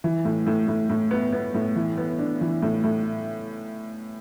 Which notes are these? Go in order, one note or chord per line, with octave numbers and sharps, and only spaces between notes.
E3
A2
A2
A2
A2
B3
B3
A2
E3
B3
D4
E3
A2
A2